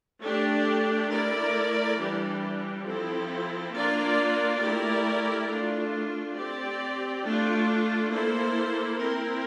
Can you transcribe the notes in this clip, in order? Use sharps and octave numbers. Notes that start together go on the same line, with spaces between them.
A3 D4 G4
A3 E4 A#4 D5
E3 G3 D4 G4
F3 C4 E4 A4
A#3 D4 F4 A#4 D5
A3 E4 G4 A#4 D5
A3 D4 F4
C4 G4 D5
A3 D4 F4
A#3 E4 A4 C5
C4 E4 A#4